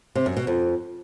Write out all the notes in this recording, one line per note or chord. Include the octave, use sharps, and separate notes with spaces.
C3
F#2
B2
F2